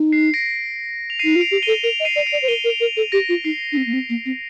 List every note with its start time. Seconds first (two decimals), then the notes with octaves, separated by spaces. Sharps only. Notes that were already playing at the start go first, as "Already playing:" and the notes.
Already playing: D#4
0.12 C7
0.34 A#6 D7
1.10 F7
1.19 D#4 C7 D#7
1.36 F4
1.41 D7 F7
1.51 G4
1.63 A4 D#7 G7
1.83 A#4 D7 F7
2.00 D#5
2.05 C7 D#7
2.16 D5
2.19 D#7
2.26 D7 F7
2.33 D5
2.42 C5
2.48 A#4 D#7 G7
2.64 A#4
2.70 D7 F7
2.81 A#4
2.97 A4
3.12 G4 A#6 D7
3.29 F4
3.44 D#4 C7
3.72 D4
3.77 C4
3.86 A#3
3.93 C4
4.09 A#3
4.26 C4